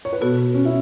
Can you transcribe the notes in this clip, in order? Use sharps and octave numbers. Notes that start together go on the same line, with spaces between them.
C#5
B4
B2 B3 F#4 A4
C#4
E4